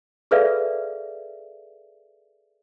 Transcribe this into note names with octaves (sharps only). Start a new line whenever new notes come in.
G#4 A4 B4 D5 E5 F5